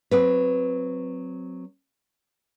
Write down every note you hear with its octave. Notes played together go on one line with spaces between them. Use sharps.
F#3 C4 B4